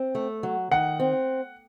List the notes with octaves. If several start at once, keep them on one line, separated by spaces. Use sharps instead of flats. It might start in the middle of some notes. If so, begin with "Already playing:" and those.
Already playing: C4
A3
F#3
D#3 F#5
C4